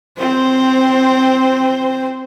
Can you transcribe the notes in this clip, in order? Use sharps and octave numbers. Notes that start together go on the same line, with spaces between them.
C4 C5